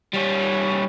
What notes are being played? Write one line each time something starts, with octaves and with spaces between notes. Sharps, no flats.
G3 C#4